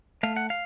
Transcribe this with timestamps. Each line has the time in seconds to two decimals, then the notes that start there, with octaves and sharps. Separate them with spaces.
0.23 A3 F5
0.36 F#5
0.50 F5